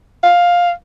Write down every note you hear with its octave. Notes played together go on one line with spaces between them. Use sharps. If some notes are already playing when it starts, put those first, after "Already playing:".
F5